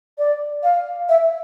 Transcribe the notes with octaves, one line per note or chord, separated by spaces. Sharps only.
D5
F5
E5